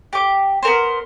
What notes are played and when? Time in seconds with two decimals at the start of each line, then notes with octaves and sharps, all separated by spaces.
0.13 G4 D6
0.63 B3 A#4 C5